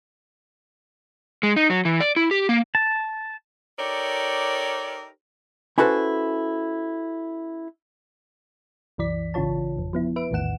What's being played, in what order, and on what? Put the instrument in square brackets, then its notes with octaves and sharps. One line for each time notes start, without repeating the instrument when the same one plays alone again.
[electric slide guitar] G#3
D#4
F#3
E3
D5
E4
G4
A#3
[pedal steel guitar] A5
[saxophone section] D#4 G4 A4 A#4 C#5 D5
[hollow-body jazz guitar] C#4 E4 F#4 A4 B4 C5
[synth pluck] C2 F#2 E3 D5 B6
G#1 C#3 E3 F4 C#5 A5
G#1 F2
F3 B3 E4
B4 E5 D7
A#1 E2 A2 D#3 F#5 E7